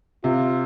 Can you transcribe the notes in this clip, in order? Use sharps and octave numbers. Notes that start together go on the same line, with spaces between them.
C3 F4